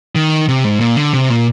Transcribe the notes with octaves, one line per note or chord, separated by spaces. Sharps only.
D#3
C3
G#2
A#2
D3
C3
A#2